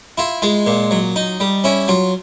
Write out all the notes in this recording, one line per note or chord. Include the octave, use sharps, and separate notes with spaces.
E4 F4
G#3 F4
A#2
F#3
D#4
G3
C#4 E4
F#3 F4